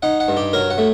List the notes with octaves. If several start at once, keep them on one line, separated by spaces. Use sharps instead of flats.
D#4 F#5
F#5
G2
G4
F#3 A#4
F#5
A3